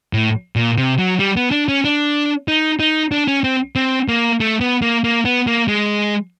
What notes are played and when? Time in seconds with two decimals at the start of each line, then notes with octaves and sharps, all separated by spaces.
0.13 A2
0.56 A#2
0.78 C3
0.99 F#3
1.19 G3
1.36 B3
1.51 D4
1.68 C#4
1.84 D4
2.48 D#4
2.80 D#4
3.12 D4
3.28 C#4
3.44 C4
3.76 C4
4.08 A#3
4.40 A3
4.61 B3
4.82 A#3
5.04 A#3
5.25 B3
5.47 A#3
5.68 G#3